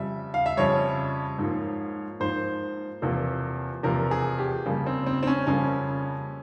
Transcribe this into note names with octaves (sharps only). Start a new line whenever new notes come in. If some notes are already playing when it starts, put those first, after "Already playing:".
Already playing: F2 C#3 G3 E5
F5
E5
F2 C#3 G3 C#5
G#2 F3 A#3
G#2 F3 A#3 C5
E2 C3 F3 A#3
E2 C3 F3 A#3 A#4
G#4
G4
F2 C#3 G3 A#3
C4
C4
C4
C#4
F2 C#3 G3 A#3 C#4